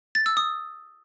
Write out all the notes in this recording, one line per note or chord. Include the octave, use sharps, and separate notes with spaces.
A6
E6
D#6